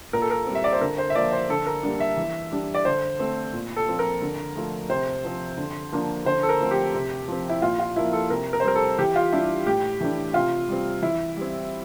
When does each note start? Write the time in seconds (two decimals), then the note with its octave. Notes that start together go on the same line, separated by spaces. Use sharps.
0.13 A#2 A#4
0.22 A4
0.31 A#4
0.47 G3 C4
0.55 E5
0.64 D5
0.73 C5
0.81 D3 A#4
0.98 C5
1.10 E5
1.15 F3 A#3 D5
1.32 C5
1.49 D3 A4
1.67 A#4
1.83 G3 A#3 D4
2.00 E5
2.17 E3
2.52 G3 D4
2.75 D5
2.85 D3 C5
3.19 A3 C4
3.53 A#2
3.76 A4
3.88 F3 C4
3.99 A#4
4.22 D3
4.56 F3 A3
4.90 C3 C5
5.24 F3 C4
5.58 D3
5.92 F3 A#3 D4
6.25 D3 C5
6.43 A4
6.49 A#4
6.60 F3 A3 C4
6.71 G4
6.94 C3
7.28 F3 C4
7.49 E4
7.62 A#2 F4
7.79 F4
7.96 F3 A#3 E4
8.13 A4
8.30 C3 A#4
8.53 A#4
8.60 C5
8.64 G3 C4 A#4
8.75 A4
8.98 E3 G4
9.16 F4
9.32 G3 D4 E4
9.66 A2 G4
10.01 E3 A3 D4
10.34 C3 F4
10.69 G3 C4
11.02 E3 E4
11.37 G3 C4